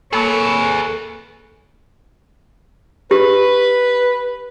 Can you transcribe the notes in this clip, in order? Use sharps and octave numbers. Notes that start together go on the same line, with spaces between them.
A#3 G#4 A4 B4 C#5
G4 B4